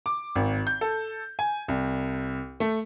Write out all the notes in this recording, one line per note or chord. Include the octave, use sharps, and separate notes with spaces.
D6
G#1
G6
A4
G#5
C2
A3